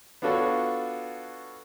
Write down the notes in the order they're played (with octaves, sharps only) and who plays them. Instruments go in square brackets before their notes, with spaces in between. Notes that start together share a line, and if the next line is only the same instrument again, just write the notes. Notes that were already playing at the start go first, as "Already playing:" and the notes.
[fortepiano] B3 D4 F4 F#4 A4 C#5